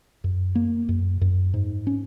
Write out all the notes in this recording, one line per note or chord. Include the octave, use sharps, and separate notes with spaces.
F#2
A#3
F#2
F#2
G#2
C#4